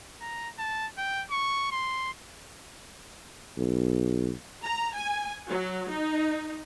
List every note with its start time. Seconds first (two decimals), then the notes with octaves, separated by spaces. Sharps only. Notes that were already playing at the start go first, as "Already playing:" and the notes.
0.21 A#5
0.59 A5
0.98 G5
1.31 C#6
1.72 C6
3.58 B1
4.63 A#5
4.94 G#5
5.48 F#3
5.89 D#4